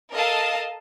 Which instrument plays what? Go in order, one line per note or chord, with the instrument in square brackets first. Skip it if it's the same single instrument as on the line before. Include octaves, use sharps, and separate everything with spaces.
[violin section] A4 A#4 D#5 F5 A5